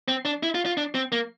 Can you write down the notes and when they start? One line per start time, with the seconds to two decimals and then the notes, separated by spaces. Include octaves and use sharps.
0.08 C4
0.25 D4
0.43 E4
0.55 F4
0.66 F4
0.77 D4
0.95 C4
1.12 A#3